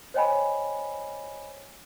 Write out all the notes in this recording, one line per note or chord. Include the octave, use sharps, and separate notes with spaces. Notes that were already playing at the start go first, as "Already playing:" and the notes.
C5 C#5 D#5 G5 G#5 B5